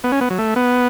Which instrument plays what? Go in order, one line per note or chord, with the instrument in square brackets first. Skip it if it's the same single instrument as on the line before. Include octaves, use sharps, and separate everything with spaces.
[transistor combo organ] B3
C#4
B3
F#3
A3
B3